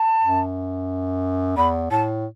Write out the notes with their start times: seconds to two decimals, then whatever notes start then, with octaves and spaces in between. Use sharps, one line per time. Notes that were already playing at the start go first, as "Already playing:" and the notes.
Already playing: A5
0.21 F#2
1.56 E2 B5
1.91 A2 A5